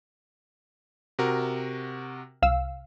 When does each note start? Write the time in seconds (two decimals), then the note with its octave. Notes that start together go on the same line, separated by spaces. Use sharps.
1.19 C3 F#4 A#4
2.42 C2 F5 E6